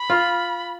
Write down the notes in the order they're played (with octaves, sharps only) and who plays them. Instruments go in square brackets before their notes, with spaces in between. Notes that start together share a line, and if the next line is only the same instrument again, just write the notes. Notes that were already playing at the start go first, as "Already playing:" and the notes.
Already playing: [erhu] B5
[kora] F4